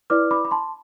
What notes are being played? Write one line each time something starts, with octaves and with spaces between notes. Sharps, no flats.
E4 B4 D5 D6 F6
B5 D6
B5
A5 C6